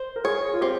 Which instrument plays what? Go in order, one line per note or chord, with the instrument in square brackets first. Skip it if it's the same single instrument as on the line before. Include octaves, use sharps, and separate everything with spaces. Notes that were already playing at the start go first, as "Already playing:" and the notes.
Already playing: [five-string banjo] C5
[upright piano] A#4
[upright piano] G#4 [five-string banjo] C#5
[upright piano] F4
[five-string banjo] C4 [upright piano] G4